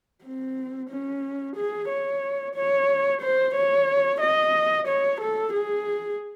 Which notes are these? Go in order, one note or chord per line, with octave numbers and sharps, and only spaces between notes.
C4
C#4
G#4
C#5
C#5
C5
C#5
D#5
C#5
A4
G#4